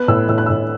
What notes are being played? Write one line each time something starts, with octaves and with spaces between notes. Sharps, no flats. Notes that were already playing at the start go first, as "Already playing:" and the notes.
Already playing: B3 F#6
A2 E6
A2 E6
F#6
A2 E6